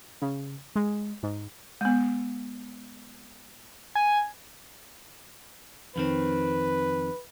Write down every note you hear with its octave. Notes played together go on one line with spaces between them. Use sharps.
C#3
G#3
G#2
G#3 B3
G#5
F2 D#3 C4 B4